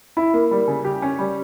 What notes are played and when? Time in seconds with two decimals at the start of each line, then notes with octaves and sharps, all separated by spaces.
0.17 E4
0.34 A#3
0.51 G3
0.68 C#3
0.85 G4
1.02 C#4
1.19 G3